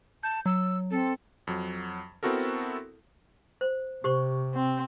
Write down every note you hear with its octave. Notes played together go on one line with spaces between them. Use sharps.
A5 G6
F#3 E6
C4 A4
F2 F#3
B3 C4 E4 F#4 A4 A#4
C5
C3 G4 C5 C#6
C4